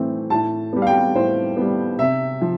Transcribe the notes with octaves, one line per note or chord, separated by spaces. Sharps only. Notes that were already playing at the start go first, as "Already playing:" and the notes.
Already playing: A2 E3 A3 C4
A2 A5
G3 B3
F5
G5
A2 C5
G3 B3
C3 E5
F3